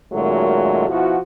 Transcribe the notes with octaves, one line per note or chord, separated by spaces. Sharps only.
F#2 A#2 D#3 F#3 G#3 A3
B2 F3 E4 F#4